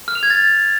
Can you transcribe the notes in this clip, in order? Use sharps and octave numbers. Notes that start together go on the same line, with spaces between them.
F6
F7
G#6
A6